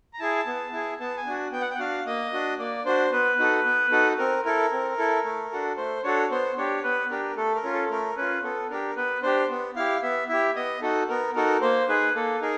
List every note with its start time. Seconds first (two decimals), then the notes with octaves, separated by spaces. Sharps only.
0.13 A#5
0.20 E4 G#4 A5
0.47 B3
0.73 E4 G#4
0.99 B3 A5
1.17 G#5
1.26 D4 F#4
1.52 B3 G5
1.61 F#5
1.70 G5
1.75 F#5
1.79 D4 F#4 F5
2.06 A#3 D#5
2.33 D4 F#4
2.59 A#3 D5
2.85 D4 F#4 C5
3.12 B3 B4
3.39 D#4 F#4 A4
3.65 B3
3.92 D#4 F#4 A4
4.18 C4 A#4
4.45 E4 A4 A#4
4.72 C4
4.98 E4 A4
5.25 A3
5.52 D4 F#4 A4
5.77 A3 C5
6.04 D4 F#4 A4 C#5
6.31 B3 C5
6.58 D4 G4 C#5
6.84 B3 B4
7.10 D4 G4 A#4
7.37 A3 A4
7.55 A#4
7.64 C#4 F4
7.73 A4
7.90 A3 A#4
8.17 C#4 F4 B4
8.43 B3 A4
8.70 D4 G4 A#4
8.96 B3 B4
9.22 D4 G4 C5
9.50 B3
9.76 E4 G4 F5
10.02 B3 E5
10.29 E4 G4 E5
10.56 B3 D#5
10.82 D#4 F#4 A4
11.08 B3 A#4
11.35 D#4 F#4 A4 A#4
11.61 A#3 C5
11.89 D#4 G#4 B4
12.15 A#3 A4
12.41 D#4 G#4 A#4